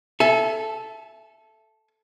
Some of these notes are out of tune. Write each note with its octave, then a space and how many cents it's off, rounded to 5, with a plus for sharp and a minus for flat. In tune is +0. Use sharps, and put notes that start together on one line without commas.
A4 -10 E5 +10 G#5 +35